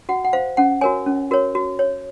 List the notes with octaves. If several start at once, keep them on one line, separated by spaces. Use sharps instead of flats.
F#4 F#5
F#5
C5 F5
C#4 F#5
F#4 A#4 C#5 G#5
C#4
F#4 A#4 C#5
F#4
C#5